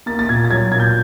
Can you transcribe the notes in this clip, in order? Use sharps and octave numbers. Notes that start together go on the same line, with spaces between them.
A#3 A6
A6
A#2 G#6
A6
F#3 G#6
A#2 G#6
G6